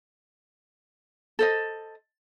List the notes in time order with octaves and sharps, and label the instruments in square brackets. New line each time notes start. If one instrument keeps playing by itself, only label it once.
[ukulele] A4 C5 D#5